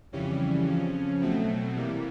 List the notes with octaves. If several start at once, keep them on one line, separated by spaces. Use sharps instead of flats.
F2 C#3 E3 G3 C#4
F2 C#3 F3
B2 F#3 A3 C4
C3 E3 G3 A#3